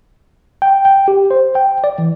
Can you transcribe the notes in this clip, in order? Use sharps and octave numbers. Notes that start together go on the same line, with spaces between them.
G5
G5
G4
C5
G5
D5
E3